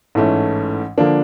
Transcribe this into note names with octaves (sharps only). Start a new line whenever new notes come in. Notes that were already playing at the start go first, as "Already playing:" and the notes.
A1 G#2 E3 A3 C#4
D3 F3 A#3 D4